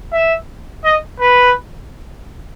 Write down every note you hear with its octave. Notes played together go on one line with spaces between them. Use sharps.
E5
D#5
B4